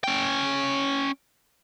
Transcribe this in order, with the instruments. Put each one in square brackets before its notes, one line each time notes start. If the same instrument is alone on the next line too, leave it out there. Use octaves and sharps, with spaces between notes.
[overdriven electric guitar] C#4 G5